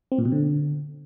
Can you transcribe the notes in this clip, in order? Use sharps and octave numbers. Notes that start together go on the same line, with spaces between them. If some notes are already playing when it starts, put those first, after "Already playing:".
C4
A#2
B2
D3